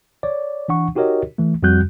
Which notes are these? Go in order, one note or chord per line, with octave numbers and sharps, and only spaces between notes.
C#5 D5
E3 D4 F#5 C#6
D#4 F#4 G4 A#4 C#5 D#5
E3 A3
F2 G3 F#4 F#6 G6